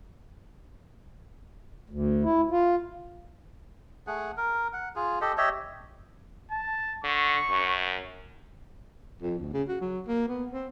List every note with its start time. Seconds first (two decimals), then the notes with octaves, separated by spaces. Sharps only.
1.90 D2
2.24 E4
2.51 F4
4.07 A3 G#4 F#5
4.37 A#4
4.73 F#5
4.96 F4 G#4
5.21 G4 A4 D#5
5.37 G4 C#5 D#5 E5
6.51 A5
7.04 D3 C#6
7.50 F#2
9.22 F2
9.39 D2
9.53 C#3
9.69 F#4
9.81 F#3
10.07 A#3
10.28 B3
10.52 C4